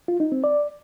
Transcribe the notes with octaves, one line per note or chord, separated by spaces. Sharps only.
F4
D#4
C4
D5